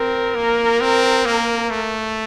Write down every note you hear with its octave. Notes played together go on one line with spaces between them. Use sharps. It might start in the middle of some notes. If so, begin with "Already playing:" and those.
Already playing: C4 A#4
A#3
C4
A#3
A3